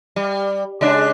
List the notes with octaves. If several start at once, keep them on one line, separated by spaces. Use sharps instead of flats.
G3
C#3 G#3 D4